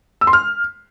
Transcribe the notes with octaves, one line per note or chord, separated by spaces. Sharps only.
E6
C6
F6